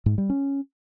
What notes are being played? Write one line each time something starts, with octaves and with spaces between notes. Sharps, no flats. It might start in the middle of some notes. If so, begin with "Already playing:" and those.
G#2
G3
C#4